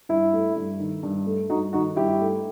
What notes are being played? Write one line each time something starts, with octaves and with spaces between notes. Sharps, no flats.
G2 E4
A3
G2
D#3
G2
A3
G2 D#4 F#4
D#3 D#4 F#4
G2 E4 G4
A3